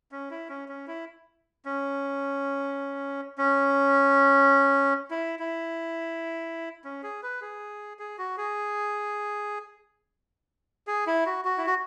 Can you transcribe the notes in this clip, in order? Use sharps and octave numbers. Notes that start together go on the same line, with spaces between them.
C#4
E4
C#4
C#4
E4
C#4
C#4
E4
E4
C#4
G#4
B4
G#4
G#4
F#4
G#4
G#4
E4
F#4
F#4
E4
F#4